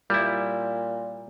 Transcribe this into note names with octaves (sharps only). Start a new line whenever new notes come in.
A#2 G3 E4